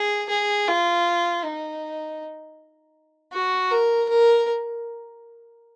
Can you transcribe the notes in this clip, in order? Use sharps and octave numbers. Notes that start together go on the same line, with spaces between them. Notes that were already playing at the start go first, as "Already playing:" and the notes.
Already playing: G#4
G#4
F4
D#4
F#4
A#4
A#4